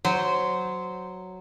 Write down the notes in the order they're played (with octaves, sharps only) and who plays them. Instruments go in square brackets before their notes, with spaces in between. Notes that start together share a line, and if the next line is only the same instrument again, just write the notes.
[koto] F#3 [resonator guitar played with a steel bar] C5